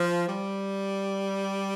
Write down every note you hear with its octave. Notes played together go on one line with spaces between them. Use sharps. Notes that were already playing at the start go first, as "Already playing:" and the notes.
Already playing: F3
G3